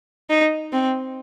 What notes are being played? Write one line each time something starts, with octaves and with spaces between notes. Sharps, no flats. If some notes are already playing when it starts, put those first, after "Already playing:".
D#4
C4